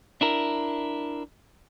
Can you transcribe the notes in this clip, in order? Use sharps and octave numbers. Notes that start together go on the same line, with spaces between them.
D4 E4 A#4